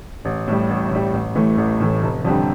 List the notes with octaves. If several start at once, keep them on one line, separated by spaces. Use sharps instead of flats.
A1
A2 G3
A1
A2 G3
A1
A2 E3 A3
A1
A2 E3 A3
F1
F2 D3 G3 C4